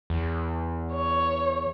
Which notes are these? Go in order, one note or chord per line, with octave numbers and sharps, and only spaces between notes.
E2
C#5